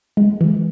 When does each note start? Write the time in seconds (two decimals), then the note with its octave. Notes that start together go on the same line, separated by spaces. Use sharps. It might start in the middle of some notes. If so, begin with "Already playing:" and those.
0.17 G#3
0.41 E3